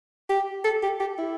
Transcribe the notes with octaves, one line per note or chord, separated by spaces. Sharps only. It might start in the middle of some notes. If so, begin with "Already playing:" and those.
G4
A4
G4
G4
E4